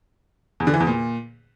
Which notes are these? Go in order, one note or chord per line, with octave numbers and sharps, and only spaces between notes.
E2
D3
E3
E2
A#2